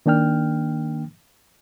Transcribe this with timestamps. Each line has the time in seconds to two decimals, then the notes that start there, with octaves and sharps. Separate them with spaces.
0.06 D#3 A#3 D4 G5 F6